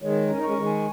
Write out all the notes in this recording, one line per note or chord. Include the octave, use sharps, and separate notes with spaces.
D#3 G#3 C#5
A#4
C#4
D#4
G#3 C#4 C#6
D#3 G#3
G#5